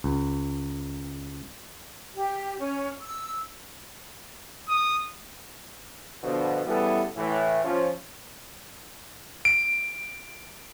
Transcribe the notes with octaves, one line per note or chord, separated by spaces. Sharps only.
C#2
G4
C#4
E6
D#6
B2 D3 F3
C#3 E3 G3 B3 E4 A4
A2 E3
F3 C#4
D7